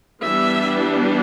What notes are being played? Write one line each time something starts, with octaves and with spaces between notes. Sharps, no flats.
E3 G3 B3 D4 E5